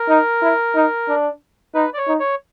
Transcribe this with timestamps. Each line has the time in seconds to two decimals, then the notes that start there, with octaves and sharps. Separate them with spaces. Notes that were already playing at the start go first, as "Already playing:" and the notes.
Already playing: A#4
0.09 D#4
0.42 E4
0.75 D#4
1.08 D4
1.75 D#4 B4
1.94 D5
1.98 C#5
2.08 D#4
2.20 C#5